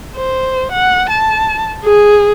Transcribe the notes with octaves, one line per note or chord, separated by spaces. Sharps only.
C5
F#5
A5
G#4